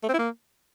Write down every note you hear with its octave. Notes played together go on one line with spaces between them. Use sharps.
A3
C4
E4
A#3